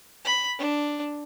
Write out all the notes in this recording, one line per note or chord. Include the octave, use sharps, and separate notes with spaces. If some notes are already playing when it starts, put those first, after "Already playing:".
B5
D4